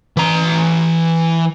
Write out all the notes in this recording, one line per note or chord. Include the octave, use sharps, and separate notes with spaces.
E3 A#5